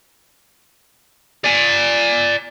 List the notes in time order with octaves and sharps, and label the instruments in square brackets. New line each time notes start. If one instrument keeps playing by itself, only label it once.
[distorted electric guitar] D5 G#5